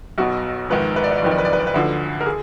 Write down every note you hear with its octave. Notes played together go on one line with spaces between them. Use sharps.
B1 B2 F#4
A#1 G#2 D#3 B4
B4
D5
B4
D5
F#1 F2 D#3 B4
D5
B4
D5
B4
D5
B4
D2 D3 F3
A#4
G#4